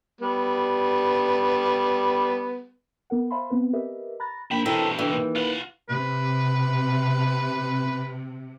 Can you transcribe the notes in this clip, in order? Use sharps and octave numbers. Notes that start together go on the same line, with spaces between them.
G3 B3
B3 A#4 F#5
C5 E5 F5 A5 B5 C6
B3 C4 B4
G4 A#4 B4 D#5 E5
A#5 B5 F#6 A6 A#6
A#1 D#4 G5 B5
G2 B2 E3 C4 A4 A#4
D3 E3
D#2
F4 B4 F#5
C3 B4